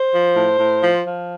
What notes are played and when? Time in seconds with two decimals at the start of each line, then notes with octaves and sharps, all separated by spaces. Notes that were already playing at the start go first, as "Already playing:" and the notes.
Already playing: C5
0.13 F3
0.36 A2
0.59 A2
0.82 F3
1.04 F3